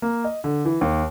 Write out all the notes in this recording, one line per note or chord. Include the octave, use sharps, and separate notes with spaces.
A#3
D#5
D3
E3
D#2